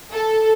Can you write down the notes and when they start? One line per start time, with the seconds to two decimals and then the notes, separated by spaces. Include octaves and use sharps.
0.13 A4